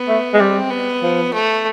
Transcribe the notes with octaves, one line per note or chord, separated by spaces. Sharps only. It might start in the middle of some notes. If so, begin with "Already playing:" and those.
Already playing: B3
A3
G#3
G3 C4
B3
F3
A3